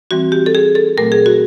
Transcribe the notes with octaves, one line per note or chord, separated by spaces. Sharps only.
E3 G3 C4 F#4
G4
A4
G#4
A4
A#2 F#3 A3 C4 A#4
G#4
F#4